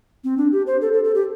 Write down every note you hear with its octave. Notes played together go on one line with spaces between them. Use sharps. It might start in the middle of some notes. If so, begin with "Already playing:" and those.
C4
D4
G4
C5
A4
A4
A4
G4